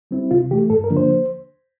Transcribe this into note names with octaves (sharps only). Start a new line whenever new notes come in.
G3 C4 E4
C3 F4
E3 A3 G4
G2 A4
A#4
D3 F3 A#3 D4
C5